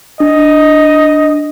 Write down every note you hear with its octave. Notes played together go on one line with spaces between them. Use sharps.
D4 D#5